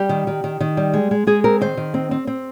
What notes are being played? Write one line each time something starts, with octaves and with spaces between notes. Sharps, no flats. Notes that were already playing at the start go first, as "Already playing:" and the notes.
Already playing: G3 G4
D#3
D#3
D#3
D#3
G3
G#3
G#3
G#3 G#4
C4 A#4
D#3 C5
D#3
C4
C4
C4